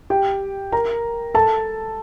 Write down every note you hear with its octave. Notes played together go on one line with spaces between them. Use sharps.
G4 G5
A#4 A#5
A4 A5